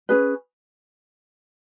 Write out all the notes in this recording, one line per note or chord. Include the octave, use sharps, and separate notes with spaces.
C#4 G#4 B4